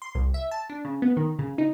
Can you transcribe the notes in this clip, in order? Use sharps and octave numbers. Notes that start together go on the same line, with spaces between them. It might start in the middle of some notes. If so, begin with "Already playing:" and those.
C6
C2
E5
A5
D4
C#3
B3
D#3
C#3
D#4